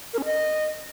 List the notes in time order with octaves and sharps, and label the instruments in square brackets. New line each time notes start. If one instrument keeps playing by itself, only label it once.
[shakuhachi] A#4
C#4
D#5